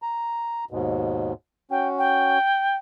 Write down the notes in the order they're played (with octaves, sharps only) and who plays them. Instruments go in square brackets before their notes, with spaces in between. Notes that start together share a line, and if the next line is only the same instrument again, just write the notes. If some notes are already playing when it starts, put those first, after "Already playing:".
[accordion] A#5
D#2 G#2 B2
[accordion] C#4 F#4 [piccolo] G5
[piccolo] G5